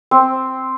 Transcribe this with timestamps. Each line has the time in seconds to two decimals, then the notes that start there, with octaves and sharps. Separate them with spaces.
0.11 C4